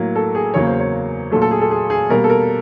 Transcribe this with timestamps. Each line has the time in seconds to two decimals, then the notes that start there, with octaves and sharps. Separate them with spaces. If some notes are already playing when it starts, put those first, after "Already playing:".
Already playing: A2 F#3 A#3
0.16 A4
0.35 G#4
0.54 E2 C#3 F#3 A#3 C#5
0.67 C5
0.80 C#5
1.31 A#2 F#3 A3 A4
1.42 A4
1.51 G#4
1.61 A4
1.71 G#4
1.90 G#4
2.09 B2 G3 A#3 A#4
2.24 A4
2.29 A#4